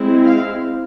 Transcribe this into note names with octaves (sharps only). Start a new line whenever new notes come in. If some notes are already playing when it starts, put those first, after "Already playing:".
Already playing: G#3 C4 E4
F5